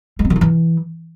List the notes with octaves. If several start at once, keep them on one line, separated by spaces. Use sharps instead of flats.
G#3
C4
D#3
D#4
E3